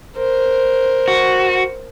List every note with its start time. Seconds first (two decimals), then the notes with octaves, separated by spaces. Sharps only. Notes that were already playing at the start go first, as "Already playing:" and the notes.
0.17 A#4 C5
1.08 F#4